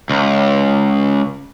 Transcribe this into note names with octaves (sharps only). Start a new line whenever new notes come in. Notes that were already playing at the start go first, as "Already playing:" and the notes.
C#2